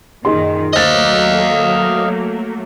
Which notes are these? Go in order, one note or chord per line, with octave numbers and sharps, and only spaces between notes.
F#2 A#2 D#3 D#4 G#4 C6
F#3 A3 A#3 C5 D#5 F5 A6